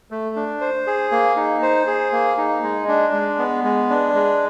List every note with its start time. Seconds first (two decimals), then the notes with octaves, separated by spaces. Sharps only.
0.11 A3
0.36 D4
0.61 C5
0.87 G#4
1.11 A#3
1.36 D#4
1.62 C5
1.87 G#4
2.12 A#3
2.38 D#4
2.63 G#3
2.88 D4
3.13 G#3
3.39 B3
3.64 G#3
3.90 D4
4.14 G#3